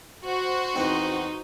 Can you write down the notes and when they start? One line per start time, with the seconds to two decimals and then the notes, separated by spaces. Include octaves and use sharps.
0.25 F#4 C5
0.76 E2 C4 D#4